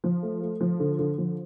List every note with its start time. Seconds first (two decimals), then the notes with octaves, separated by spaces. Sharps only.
0.04 F3
0.23 A3
0.42 A3
0.61 F3
0.79 D3
0.99 D3
1.18 F3